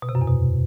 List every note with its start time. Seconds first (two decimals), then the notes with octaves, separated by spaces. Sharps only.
0.02 B2
0.09 C3
0.15 F#2
0.21 E2
0.28 B2